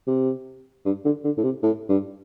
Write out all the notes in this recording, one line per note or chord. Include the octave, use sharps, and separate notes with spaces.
C3
G2
D3
D3
A2
C3
A2
G2